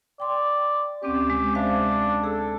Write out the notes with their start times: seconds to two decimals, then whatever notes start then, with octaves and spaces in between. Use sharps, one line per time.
0.20 D5 G5 C6
1.03 D2 C4 C#4 G4
1.28 C3 G#3
1.55 D4 C5 E5 F5
2.24 G#4 A4